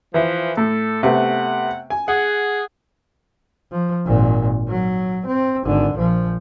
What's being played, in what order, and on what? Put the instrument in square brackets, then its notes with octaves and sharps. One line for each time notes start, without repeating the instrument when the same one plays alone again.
[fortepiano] E3 E5 [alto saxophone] F3
[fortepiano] A2 [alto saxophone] A4
[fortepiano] C3 A3 B3 [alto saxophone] F#5
[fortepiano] G#5
[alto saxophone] G#4 [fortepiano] F#5
[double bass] F3
G#1 A#2
F#3
C4
G#1 D3
A#1 F3